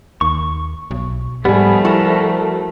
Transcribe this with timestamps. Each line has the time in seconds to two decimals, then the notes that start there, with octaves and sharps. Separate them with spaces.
0.21 D#2 C#6
0.91 B1
1.45 G#2 F3 G3 A3 B3 G#4
1.85 E4 F#4 A4 A#4